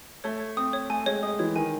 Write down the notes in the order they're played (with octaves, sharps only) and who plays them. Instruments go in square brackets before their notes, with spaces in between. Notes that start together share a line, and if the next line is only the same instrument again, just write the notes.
[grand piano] A3 [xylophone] C#5
[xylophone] C#5
[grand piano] C4 [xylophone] D#6
[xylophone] C#5
[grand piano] A3 [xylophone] G#5
[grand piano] G#3 [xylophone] C#5
[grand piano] G#3 [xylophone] D#6
[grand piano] E3 [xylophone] C#5
[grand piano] D#3 [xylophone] G#5